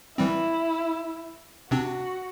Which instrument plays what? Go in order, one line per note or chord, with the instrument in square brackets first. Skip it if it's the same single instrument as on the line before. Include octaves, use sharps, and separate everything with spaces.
[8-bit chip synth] E3 G3 C4 [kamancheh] E4
[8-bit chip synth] C3 C4 D4 [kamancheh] F#4